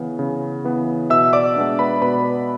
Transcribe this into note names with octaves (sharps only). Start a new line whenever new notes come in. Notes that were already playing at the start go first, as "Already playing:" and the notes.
Already playing: C#3 E3 B3
C#3
E3 B3
B2 E5 E6
D5 D6
G#3 B3 D4
B4 B5
B2 B4 B5